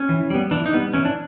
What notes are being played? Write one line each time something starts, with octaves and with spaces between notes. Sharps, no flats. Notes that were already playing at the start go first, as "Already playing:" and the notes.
Already playing: C#4
E3
G3 B3
E3 D4
D#4
G3 B3
E3 C#4
D4